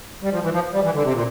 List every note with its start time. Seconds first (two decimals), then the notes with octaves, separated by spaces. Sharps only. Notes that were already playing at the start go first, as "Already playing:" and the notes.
0.22 G3
0.32 F3
0.43 E3
0.53 F3
0.73 G3
0.84 E3
0.93 D3
1.03 C3
1.13 A#2